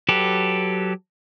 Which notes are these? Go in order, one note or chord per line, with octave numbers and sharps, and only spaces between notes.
F#3 G4 A4 B4